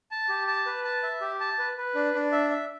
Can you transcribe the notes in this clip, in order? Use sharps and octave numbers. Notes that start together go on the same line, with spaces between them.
A5
G4
A5
B4
A5
E5
G4
A5
B4
B4
D4
D4
E5
E5